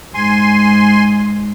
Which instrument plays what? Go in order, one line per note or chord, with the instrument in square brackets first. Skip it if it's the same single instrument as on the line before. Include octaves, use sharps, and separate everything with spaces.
[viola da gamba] G#2 [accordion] G#5 C6